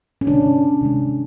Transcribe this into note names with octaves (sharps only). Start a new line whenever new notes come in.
C#4
C3 D#3 G#3 D4
C3 D#3 G#3